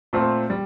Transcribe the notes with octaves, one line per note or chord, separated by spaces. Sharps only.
A#2 A3 C4
G3